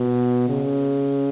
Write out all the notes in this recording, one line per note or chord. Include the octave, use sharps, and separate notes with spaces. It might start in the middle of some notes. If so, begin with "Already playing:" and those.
Already playing: B2
C#3